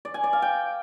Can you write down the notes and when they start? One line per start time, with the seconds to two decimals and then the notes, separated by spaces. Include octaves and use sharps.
0.05 D5
0.14 G#5
0.24 D5
0.33 F5
0.42 G5